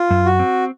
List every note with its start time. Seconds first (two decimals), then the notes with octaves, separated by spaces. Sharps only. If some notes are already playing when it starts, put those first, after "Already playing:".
Already playing: F4
0.11 F#2
0.25 F#4
0.39 C4